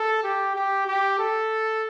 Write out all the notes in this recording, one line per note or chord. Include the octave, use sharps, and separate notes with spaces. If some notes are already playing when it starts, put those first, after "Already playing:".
Already playing: A4
G4
G4
G4
A4